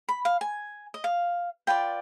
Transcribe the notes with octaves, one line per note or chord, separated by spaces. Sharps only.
B5
F5
G#5
D#5
F5
F4 B4 D5 G5